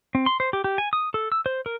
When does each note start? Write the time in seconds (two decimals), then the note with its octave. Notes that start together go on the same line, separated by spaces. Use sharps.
0.15 C4
0.26 C6
0.40 C5
0.53 G4
0.64 G4
0.78 G#5
0.93 D#6
1.14 A4
1.32 E6
1.46 C5
1.66 A#4